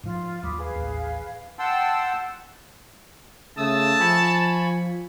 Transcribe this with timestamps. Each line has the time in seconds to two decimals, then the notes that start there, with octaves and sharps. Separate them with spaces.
0.04 G#2 F3 F4
0.43 D#2 F#3 B5 D6 D#6
0.57 G#4 B4 F5
0.76 A1 D#2
1.59 F#5 G5 A5 C6 E6
3.57 C#3 A3 A5 D#6 E6
4.00 F3 G#5 B5 C#6